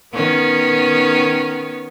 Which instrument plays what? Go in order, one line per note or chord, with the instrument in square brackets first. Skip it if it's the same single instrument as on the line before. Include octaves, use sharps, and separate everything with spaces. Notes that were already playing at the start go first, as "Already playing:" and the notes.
[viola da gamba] D#3 B3 C#4